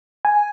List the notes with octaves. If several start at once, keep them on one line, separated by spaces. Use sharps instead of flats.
G#5